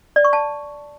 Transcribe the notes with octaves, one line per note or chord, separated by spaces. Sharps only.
D5
C#6
A5